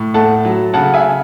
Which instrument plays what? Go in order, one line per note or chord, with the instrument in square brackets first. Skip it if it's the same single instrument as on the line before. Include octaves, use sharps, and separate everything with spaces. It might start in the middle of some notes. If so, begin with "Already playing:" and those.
Already playing: [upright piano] A2
A3 F#5 A5
F#3
C#3 F#5 A5
E5 G#5